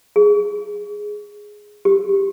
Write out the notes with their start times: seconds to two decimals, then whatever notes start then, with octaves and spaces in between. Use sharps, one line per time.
0.16 G#4
1.85 G4